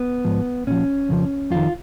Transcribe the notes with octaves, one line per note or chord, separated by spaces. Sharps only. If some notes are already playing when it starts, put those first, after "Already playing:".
Already playing: B3
G#2 F3
A#2 F3 C#4
F2 C#3 F3
F2 D#3 F4